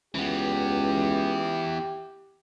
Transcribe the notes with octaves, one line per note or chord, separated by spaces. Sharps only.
C#2 E3 B3 G4